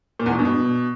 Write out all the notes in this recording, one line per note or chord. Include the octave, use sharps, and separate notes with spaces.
A#2
E2
B2
G2
B2